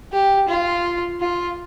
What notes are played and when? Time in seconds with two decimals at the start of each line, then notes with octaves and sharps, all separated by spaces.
0.12 G4
0.48 F4
1.20 F4